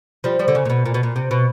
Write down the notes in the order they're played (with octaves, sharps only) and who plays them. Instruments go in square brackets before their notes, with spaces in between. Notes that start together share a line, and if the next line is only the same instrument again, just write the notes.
[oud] F3 G3
F3 G3
D3
C#3
A#2
B2
A#2
B2
A#2
C3
B2